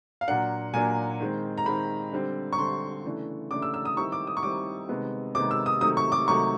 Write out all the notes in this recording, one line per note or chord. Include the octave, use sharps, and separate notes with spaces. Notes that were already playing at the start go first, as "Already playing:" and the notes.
F5
A#2 F#3 A#3 D4 F#5
A#2 F#3 A#3 D4 G#5
D#3 G#3 C4
A#5
D#3 G#3 C4 B5
D3 G3 C4
C#6
D3 G3 C4 C6
C#3 E3 A3 D4
C#3 E3 A3 D4 D6
E6
E6
D#6
D#3 G3 C4 E4 C#6
D6
D#6
C#6
D#3 G3 C4 E4 D6
C3 D#3 G#3 B3
C3 D#3 G#3 B3 D6
E6
D#6
C3 D#3 F#3 A3 D#6
C#6
D6
C3 D#3 F#3 A3 C#6